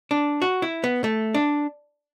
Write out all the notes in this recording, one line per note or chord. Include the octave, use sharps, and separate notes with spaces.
D4
F#4
E4
B3
A3
D4